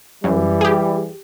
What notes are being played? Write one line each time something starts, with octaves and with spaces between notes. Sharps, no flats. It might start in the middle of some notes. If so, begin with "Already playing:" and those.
F#2 E3 G3
G4 G#4